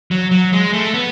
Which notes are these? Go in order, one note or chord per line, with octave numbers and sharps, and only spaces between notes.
F#3
F#3
G#3
A3
B3